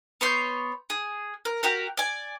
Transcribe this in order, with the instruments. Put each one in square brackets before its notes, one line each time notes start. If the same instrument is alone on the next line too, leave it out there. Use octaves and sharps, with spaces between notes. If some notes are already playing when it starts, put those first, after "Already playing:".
[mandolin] B3 C#5 C6 G6
G#4
A#4
F#4 G4 A#4
D5 G#5